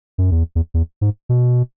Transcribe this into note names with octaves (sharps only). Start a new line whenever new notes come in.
F#2
E2
E2
E2
G#2
B2